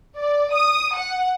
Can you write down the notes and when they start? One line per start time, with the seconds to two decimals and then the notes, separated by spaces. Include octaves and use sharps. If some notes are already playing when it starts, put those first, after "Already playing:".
0.18 D5
0.54 D#6
0.97 F#5